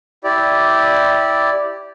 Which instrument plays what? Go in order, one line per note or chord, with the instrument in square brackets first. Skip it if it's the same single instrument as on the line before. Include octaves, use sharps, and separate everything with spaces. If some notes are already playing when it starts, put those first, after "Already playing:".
[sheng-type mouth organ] E4 G4 D5